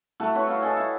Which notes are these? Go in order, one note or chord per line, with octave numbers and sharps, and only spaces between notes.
A3 E4 F#4
F#4 B4 C#5
E4 F#4 F5
A4 D#5 G#5
E4